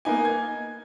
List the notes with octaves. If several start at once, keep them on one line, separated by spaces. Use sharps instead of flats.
A#3 B3 D#4 G#5
G#6